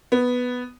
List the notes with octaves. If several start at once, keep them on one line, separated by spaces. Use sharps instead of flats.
B3